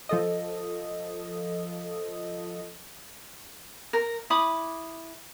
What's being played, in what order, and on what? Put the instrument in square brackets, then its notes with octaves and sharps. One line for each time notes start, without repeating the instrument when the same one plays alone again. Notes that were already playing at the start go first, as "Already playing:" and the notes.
[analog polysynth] F3 A4 D#5
[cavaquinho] A#4
E4 B5 D6 D#6